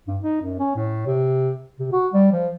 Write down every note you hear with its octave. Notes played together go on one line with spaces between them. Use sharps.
G2
D#4
F#2
C#4
A2
C3
C3
F#4
G3
F3